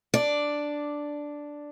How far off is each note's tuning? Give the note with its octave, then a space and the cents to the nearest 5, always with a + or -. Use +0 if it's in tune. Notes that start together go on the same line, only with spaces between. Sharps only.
D4 +0 D5 +0